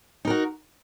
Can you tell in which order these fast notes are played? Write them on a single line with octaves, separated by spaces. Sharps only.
D#4 A#4 F#4